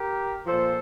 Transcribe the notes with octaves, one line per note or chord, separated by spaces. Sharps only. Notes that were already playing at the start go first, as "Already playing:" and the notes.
Already playing: G4 A#4
A#2 F3 A4 C5